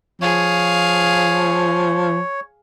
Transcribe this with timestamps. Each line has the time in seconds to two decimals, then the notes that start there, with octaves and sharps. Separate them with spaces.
0.22 F3 G#4 C#5 F5